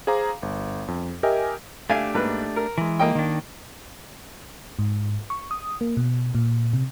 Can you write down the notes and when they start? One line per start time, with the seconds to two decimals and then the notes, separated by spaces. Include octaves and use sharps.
0.07 G#4 C5 F5 A#5 D6
0.43 G1
0.88 F2
1.23 G4 A#4 D#5 E5 G5 G#5
1.90 A3 D4 G4 E5 F5 G#5
2.14 G#2 A#3 B4
2.56 A#4
2.78 E3 G#3
2.99 A#3 D#5 G5
3.15 D#3 D4
4.79 G#2
5.30 C#6
5.51 D#6
5.81 A#3
5.97 B2
6.35 A#2
6.73 C3